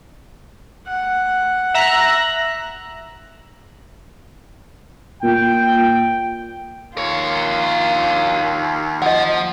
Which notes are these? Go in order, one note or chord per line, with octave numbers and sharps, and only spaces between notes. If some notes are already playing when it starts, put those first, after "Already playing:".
F#5
E5 A#5 F#6
A#2 G5
D#2 F4 A#4 C#5
F3 D#5 F#5